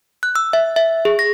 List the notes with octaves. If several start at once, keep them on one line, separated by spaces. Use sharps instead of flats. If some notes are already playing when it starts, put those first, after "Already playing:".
F#6
E6
E5
E5
G#4
A#6